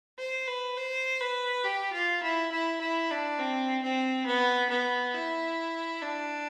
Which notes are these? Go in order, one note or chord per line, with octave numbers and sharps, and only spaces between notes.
C5
B4
C5
B4
G4
F4
E4
E4
E4
D4
C4
C4
B3
B3
E4
D4